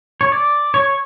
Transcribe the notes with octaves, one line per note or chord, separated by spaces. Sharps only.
C#5
D5
C#5